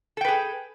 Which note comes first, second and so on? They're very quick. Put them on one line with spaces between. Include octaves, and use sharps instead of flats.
A4 G5 B4 G#4